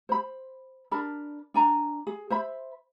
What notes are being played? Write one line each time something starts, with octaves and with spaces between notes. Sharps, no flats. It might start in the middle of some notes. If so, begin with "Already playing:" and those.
C5 B5
D4 A#4 A5 B5
D4 G#5 A#5
G#4
C5 E5 B5